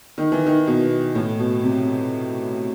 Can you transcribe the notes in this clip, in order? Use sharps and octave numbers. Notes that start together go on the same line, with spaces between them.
D#3
E3
D#3
B2
A2
B2
C3